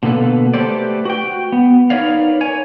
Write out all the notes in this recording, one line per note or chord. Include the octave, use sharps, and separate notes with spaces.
B2 D3 A#3 B3 A4 B4
A3 G4 A4 B4 C5 D5
F#4 G5
B3
D#4 A#4 B4 C#5 D5 F5
C#5 G#5